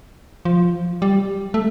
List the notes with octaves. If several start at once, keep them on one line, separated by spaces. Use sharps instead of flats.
F3
G3
A3